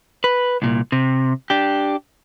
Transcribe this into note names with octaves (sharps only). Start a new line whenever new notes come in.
B4
C2 A#2
C3
D4 G4